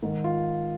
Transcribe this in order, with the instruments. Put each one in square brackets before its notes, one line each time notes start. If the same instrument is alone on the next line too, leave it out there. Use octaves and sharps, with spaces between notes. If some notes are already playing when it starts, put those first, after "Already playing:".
[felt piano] G#2 D#3
F4